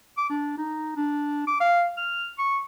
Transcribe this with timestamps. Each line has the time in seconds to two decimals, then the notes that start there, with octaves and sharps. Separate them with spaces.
0.17 D6
0.30 D4
0.57 D#4
0.96 D4
1.47 D6
1.60 F5
1.97 F6
2.39 C#6